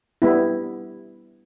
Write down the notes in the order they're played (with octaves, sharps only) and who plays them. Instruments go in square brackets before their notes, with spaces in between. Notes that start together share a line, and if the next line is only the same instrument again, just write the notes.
[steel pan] G3 B3 E4